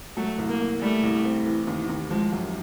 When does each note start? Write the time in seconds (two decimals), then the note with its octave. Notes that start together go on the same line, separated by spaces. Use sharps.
0.17 F#3 A3
0.38 C2
0.49 A#3
0.60 A#3
0.81 G3 A3
1.03 C2
1.24 C4
1.46 E3
1.67 D#2
1.89 D#2
2.10 F3 G#3
2.33 F#2